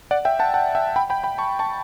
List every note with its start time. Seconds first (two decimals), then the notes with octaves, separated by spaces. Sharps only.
0.11 D5 F#5
0.25 E5 G5
0.39 F#5 A5
0.54 F#5 A5
0.75 E5 G5
0.96 G5 B5
1.10 G5 B5
1.24 G5 B5
1.38 A5 C#6
1.59 A5 C#6